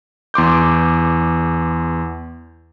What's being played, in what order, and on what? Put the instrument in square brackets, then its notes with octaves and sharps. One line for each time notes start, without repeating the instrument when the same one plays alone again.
[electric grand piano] E2 C6 D6 G6